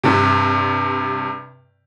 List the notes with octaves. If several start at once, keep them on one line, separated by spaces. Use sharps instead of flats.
G2 C3